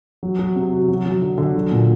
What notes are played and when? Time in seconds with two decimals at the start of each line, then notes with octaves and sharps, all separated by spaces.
0.23 F#3
0.39 F#3
0.56 C3
0.73 F#4
0.88 F#3
1.06 F#3
1.22 D3
1.38 D3
1.55 F#3
1.72 A#2